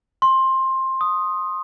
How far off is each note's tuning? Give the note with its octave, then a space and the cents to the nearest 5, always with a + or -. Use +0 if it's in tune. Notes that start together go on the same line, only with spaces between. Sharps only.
C6 +15
D#6 +0